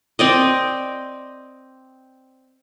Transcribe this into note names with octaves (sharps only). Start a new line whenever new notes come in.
C4 D5 D#5